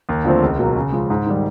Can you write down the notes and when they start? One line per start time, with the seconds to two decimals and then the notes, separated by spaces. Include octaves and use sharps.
0.09 D#2
0.24 D3 F3 A3 C4
0.42 C#2
0.59 B2 F#3 A#3
0.76 C#3
0.93 F3 G#3
1.10 G#2
1.26 D#3 G3